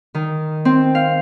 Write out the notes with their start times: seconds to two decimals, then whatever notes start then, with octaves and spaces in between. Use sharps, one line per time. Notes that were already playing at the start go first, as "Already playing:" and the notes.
0.14 D#3
0.65 C4
0.95 F5